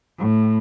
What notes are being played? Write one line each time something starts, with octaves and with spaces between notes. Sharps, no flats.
A2